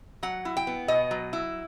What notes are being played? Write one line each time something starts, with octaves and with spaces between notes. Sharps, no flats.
F#3 F#5
E4
G5
B3
B2 D#5
F#3
E4